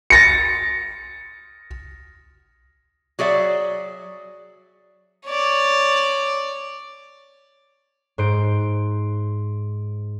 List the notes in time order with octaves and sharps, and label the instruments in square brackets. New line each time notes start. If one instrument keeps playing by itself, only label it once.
[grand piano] A6 A#6 C#7
[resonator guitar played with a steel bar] F#3 G#4 D5 E5
[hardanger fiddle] C#5 D5
[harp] G#2 C5 D7